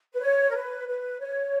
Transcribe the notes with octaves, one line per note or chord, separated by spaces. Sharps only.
B4
C#5
A#4
B4
B4
C#5